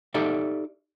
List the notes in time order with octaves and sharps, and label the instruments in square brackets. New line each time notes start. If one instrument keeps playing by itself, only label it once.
[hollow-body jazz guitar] D#4 G4 A4 D5 E5